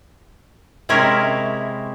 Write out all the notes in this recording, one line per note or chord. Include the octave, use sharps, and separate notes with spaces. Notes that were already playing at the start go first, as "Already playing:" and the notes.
C3 G#3 C#4 E4 A#4 C#5